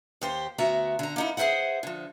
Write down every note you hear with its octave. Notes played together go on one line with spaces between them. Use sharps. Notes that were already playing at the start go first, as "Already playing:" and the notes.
D#2 G4 C5
D2 B3 F#4 E5 A#5
D3 A#5
A#3 D#4 E4
G#4 A#4 C5 E5 F#5
D3 F3